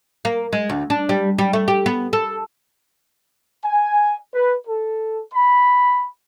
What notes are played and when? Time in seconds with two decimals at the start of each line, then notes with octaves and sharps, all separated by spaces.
0.25 A#3
0.53 G#3
0.69 D2
0.90 D4
1.09 G3
1.38 G3
1.53 A3
1.68 G4
1.86 B3
2.13 A4
3.63 G#5
4.34 B4
4.67 A4
5.33 B5